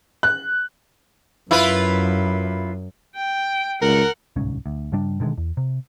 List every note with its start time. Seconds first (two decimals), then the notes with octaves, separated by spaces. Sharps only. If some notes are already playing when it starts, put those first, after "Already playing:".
0.23 F#6
1.51 F#2 E4 F4 B4
3.16 G5
3.82 C#2 A#4 F#5
4.36 D1 C2 G#2 C#4
4.66 D2
4.92 G2 C#3 G3 D4
5.20 B2 D3 D#3 G#3
5.38 E2
5.57 C3